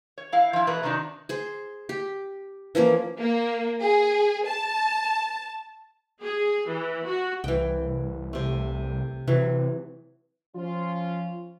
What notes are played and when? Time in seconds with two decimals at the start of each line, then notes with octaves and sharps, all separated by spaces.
0.18 C#5
0.33 E4 F5
0.53 F3 E4
0.67 B2 E3 A3 A#4 B4
0.83 C3 D#3 D4 D#4 F#4
1.29 G#4 C5
1.89 G4
2.75 E3 F3 A#3 C#4
3.19 A#3
3.82 G#4
4.47 A5
6.22 G#4
6.68 E3
7.05 F#4
7.44 C2 E3 G5
8.33 C3 A3
9.28 C3 E3 F#3
10.55 F3 C#4 F4